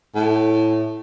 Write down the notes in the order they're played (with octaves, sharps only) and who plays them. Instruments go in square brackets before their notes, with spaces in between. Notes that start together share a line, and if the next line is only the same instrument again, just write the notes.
[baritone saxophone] A2